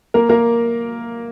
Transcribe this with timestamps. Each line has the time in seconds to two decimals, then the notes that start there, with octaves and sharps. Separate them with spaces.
0.14 A#3 A#4
0.29 A#3 A#4